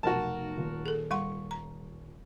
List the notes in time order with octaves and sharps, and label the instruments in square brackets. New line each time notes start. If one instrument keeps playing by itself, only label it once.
[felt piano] F1 B1 [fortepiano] F#4 A#4 A5
[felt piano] D#1 F4
[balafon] G#4 A4
[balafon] G3 F#5 C6 [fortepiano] C#6
[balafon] A#5